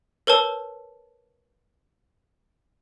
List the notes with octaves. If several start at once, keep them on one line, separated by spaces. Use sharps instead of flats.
A#4 B4 C#5 A5 E6